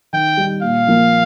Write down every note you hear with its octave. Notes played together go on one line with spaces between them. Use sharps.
D#3 G5
G3 D#4
A#2 F5
F3 A#3